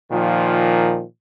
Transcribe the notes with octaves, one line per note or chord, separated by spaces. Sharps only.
A#2 D#3 F3